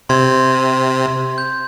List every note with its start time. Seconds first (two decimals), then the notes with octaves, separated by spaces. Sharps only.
0.09 C3 C6 G#6
1.38 G6